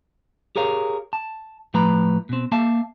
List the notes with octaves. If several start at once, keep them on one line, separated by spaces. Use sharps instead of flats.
G4 G#4 A#4 C#5 F5
A5
A2 F3 A3 B4 A#5 B5
B2 C4
A#3 E5 F5 A5